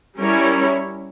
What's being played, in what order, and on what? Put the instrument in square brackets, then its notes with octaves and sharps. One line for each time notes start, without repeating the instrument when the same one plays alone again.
[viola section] G3 C#4 E4 A#4 C#5